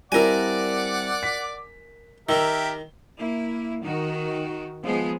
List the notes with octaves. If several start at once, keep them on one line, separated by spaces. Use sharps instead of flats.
G3 C4 E4 A#4 D5 F#5 G#5 D6
B6
D#3 G4 A#4 E5 E6 G7
A#3 E4
D#3 F#4
F3 G#3 B3 G#4